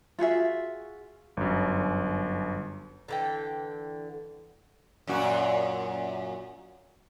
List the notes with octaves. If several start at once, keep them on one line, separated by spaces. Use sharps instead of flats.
F4 F#4 G#4 E5
G1 F#2
D3 E3 G5
F#2 A#2 F#4